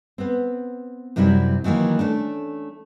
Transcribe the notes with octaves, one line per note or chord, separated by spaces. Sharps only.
B3 C4
F#2 C3 F#3 G3 C4 E4
D#3 E3 F#3 A#3
A3 C#4 D4